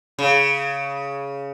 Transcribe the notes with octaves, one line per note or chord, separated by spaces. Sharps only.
C#3